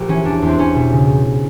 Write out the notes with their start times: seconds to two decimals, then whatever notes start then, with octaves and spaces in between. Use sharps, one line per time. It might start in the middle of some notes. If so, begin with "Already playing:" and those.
Already playing: A#1 G4
0.08 E3 C#4
0.25 E2 D4
0.42 E2
0.47 C4
0.59 E2 C#4
0.76 B2
0.92 C#3